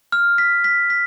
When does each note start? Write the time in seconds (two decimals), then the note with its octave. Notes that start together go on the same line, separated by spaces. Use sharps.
0.12 F6
0.38 B6
0.64 B6
0.90 B6